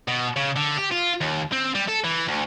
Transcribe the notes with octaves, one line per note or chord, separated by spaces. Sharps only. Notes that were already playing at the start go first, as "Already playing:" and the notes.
B2
C#3
D3
G4
F4
D#2
C4
G3
A4
E3
D2